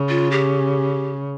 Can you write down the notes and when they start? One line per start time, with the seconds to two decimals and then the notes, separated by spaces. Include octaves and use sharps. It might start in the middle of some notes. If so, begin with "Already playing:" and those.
Already playing: C#3
0.09 F4
0.31 G4